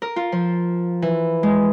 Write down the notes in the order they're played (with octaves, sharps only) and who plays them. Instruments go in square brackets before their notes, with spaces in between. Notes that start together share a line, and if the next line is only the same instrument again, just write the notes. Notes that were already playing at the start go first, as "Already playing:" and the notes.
[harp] A#4
F4
F3
E3
G#3